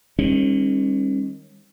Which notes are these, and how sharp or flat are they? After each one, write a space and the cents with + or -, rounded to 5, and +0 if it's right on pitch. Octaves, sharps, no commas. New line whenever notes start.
D#3 +0 G3 +45 C#4 -35